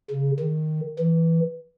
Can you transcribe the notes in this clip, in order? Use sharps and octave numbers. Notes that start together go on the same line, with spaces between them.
C#3
D#3
E3